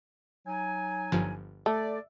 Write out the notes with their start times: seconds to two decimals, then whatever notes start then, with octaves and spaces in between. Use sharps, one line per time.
0.46 F#3 D#4 G#5
1.12 G1 G2 F3
1.66 A3 D5